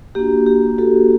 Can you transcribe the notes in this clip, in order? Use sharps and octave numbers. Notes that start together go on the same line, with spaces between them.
A#3 D4 F#4 G4
G4
F#4 A4